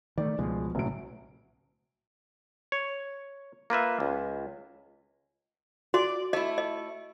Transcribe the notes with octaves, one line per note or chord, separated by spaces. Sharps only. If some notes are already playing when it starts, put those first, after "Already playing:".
D#3 A3 D5
C#2 B2 F3 G#3
F#1 B1 A2 F#3 D7
C#5
A#3 F4 B4 E5
C#2
F#4 D5
A3 E4 D#5
D#5